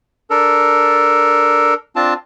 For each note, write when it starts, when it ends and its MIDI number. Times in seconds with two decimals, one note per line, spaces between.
0.30 1.74 62
0.30 1.74 69
0.30 1.74 70
1.96 2.14 60
1.96 2.14 62
1.96 2.14 65
1.96 2.14 81